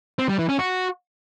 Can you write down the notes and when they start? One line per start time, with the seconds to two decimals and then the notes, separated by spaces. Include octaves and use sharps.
0.19 C4
0.29 G3
0.39 E3
0.49 C#4
0.59 F#4